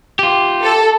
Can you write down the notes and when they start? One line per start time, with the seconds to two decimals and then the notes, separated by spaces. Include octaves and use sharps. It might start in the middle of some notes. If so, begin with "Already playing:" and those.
0.19 F4 G4
0.63 A4